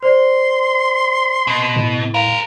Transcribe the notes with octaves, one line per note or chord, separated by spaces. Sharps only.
C5 D5 C6
B2
A2
G#4 A#4 F5